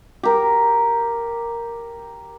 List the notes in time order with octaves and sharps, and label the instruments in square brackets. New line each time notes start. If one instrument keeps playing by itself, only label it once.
[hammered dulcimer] G4 A#4